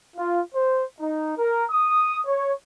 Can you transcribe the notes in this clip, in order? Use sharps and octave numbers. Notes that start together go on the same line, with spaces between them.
F4
C5
D#4
A#4
D#6
C#5